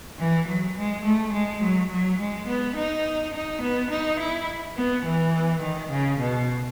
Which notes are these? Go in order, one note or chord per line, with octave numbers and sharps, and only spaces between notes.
E3
F#3
G#3
A3
G#3
F#3
F#3
G#3
B3
D#4
D#4
B3
D#4
E4
B3
E3
D#3
C#3
B2